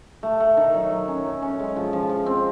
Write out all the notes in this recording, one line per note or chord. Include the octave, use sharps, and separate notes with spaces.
A3
A3
D#3
F#3
F#3
C#4
F#3
C#4
G#3
F3
F3
F3
C4